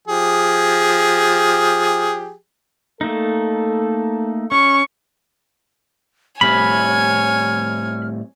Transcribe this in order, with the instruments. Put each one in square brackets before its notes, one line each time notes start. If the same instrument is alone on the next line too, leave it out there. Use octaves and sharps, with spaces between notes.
[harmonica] F3 G4 G#4
[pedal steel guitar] A3 A#3 D#4 [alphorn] A4
[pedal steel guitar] C#4 [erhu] C#6
[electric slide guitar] A2 G3 C4 [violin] C#5 G#5 [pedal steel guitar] B5 [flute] F6